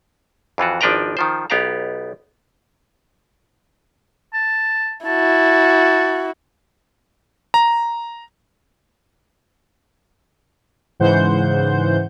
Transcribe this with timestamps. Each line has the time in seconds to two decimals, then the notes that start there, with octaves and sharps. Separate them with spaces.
0.58 F2 E3 F4 F#4
0.81 G#1 F3 D4 B4 G5 A#5
1.17 D#3 F3 C5
1.50 B1 B3 G4 F5 A#5
4.33 A5
5.06 E4 F#4 A5
7.54 A#5
11.00 G#2 C#3 E3 C5 F#5 G6